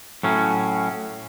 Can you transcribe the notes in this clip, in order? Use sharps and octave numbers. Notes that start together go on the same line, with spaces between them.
A2 F#3 C#4